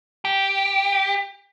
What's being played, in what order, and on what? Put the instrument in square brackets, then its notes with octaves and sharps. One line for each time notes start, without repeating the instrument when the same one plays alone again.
[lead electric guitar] G4